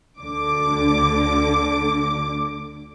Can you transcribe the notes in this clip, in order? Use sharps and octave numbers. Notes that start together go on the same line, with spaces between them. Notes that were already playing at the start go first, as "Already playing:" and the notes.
D2 D3 D6